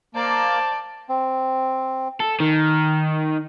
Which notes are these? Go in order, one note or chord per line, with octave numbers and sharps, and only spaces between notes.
A#3 C5 D5 A5
C4
A4
D#3